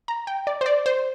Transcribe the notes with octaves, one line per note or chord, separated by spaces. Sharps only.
A#5
G5
D5
C5
D5
C5